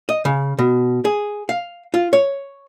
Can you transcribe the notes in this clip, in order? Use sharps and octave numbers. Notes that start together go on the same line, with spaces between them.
D#5
C#3
B2
G#4
F5
F4
C#5